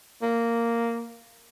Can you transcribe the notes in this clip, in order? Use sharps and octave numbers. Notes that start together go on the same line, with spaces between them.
A#3